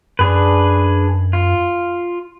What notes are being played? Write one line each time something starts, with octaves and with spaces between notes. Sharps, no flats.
F#2 D4 G#4 B4
F4